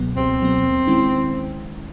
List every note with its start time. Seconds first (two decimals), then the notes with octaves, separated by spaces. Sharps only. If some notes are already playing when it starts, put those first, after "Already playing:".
Already playing: C#2 B2 F#3 B3
0.17 C#2 C4
0.40 B2 F#3 B3
0.64 D#2
0.87 D#3 G#3 C#4 E4